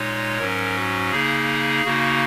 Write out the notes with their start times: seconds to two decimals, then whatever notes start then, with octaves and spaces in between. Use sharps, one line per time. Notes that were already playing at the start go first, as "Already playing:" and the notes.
Already playing: A#2 G#3 D#4 C#5
0.38 G#2 F#3 C#4 A#4
0.76 F#4
1.11 C#3 A#3 D#4 G#4
1.85 C#3 A#3 D#4 F#4